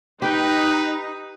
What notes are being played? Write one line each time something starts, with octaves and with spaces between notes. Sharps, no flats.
D#4 G4 B4 G5